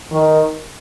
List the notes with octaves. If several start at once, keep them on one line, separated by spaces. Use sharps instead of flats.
D#3